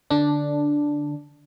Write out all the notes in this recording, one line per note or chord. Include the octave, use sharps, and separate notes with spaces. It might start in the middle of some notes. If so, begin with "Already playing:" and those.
D3 D4